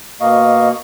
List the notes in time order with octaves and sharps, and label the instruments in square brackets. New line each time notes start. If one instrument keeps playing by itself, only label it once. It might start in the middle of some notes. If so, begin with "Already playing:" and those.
[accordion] B2 A#3 D#5 F5 C#6